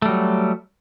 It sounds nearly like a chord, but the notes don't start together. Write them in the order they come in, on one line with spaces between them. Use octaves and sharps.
A3 G3 F#3